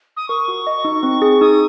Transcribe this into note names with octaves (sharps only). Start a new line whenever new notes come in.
D#6
A#4 C#6
F#4
D#5
D#4
C4
G#4
D#4 D#6